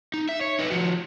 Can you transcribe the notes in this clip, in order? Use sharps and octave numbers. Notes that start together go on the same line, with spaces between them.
D#4
E5
C#5
D#4 B4
F3 F#4